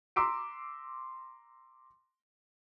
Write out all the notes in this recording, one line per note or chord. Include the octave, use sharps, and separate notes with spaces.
A#5 C6 D6 E6 B6 D7